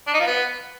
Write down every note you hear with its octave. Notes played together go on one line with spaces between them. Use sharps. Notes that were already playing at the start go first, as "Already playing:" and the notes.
D4
D#4
F3
B3